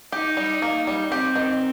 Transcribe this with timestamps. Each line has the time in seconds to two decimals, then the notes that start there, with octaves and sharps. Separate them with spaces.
0.12 D#4 G4
0.37 G3
0.62 A#3
0.87 G3
1.11 C4 G4
1.36 D#3